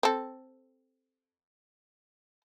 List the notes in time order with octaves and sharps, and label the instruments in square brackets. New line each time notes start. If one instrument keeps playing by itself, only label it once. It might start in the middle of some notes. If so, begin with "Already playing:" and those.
[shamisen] C4 A4